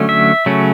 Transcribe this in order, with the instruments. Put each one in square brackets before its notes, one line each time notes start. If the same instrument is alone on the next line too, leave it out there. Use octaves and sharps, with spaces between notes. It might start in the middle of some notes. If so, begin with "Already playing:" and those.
Already playing: [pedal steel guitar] D3 F#3 A3 C#4
E5
C#3 F#3 A3 C#4